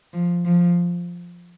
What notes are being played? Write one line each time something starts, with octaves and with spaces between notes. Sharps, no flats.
F3
F3